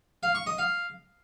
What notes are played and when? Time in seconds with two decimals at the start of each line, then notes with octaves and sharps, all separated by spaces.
0.23 F5
0.35 C#6
0.46 D#5
0.58 F5